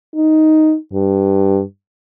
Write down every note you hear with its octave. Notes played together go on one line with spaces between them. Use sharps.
D#4
G2